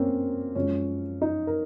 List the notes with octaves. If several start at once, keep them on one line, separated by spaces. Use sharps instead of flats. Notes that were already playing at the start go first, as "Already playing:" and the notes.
Already playing: F#2 A#3 C4 C#4
F#2 F3 G#3 C#4
D#4
A#4